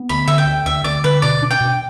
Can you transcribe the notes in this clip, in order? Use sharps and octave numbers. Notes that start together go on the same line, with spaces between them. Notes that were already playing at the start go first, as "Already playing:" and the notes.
Already playing: B3
D2 B5
D3 E5
G5
D2
D2 E5
D2 D5
D3 B4
B2 D5
D4
G5
B2